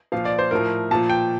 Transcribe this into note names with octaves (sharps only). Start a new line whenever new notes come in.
A#2 F3 F5
D5
C5
A2 F3 A#4
A#2 F3 A5
G5